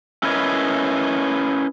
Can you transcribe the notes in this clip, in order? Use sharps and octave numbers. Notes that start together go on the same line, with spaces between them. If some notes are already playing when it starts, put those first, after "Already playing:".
C#4 E4 A#4 B4 C#5 D#5